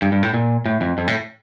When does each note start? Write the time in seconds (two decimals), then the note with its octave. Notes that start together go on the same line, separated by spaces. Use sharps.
0.02 G2
0.12 G2
0.23 A2
0.34 A#2
0.66 A2
0.81 F2
0.98 F2
1.07 A2